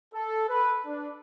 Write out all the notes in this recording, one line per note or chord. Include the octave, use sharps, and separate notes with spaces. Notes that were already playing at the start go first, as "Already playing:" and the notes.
A4
B4
D4